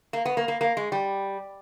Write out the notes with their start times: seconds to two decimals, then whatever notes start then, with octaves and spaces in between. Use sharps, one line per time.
0.13 A#3
0.25 B3
0.37 A#3
0.48 A#3
0.61 A#3
0.77 G#3
0.92 G3